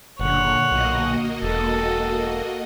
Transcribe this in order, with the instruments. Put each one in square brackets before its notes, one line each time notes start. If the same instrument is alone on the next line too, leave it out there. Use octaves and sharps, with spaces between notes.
[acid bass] F#1 [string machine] A#2 D3 [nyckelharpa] C#5 F#5
[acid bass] B1 [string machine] A#3 F#4 D#5
[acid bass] E1 [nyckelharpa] A4